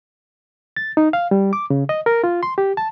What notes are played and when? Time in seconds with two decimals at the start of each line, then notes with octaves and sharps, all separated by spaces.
0.77 A6
0.97 D#4
1.13 F5
1.31 G3
1.53 D6
1.70 C#3
1.89 D#5
2.06 A#4
2.24 F4
2.43 C6
2.58 G4
2.77 A5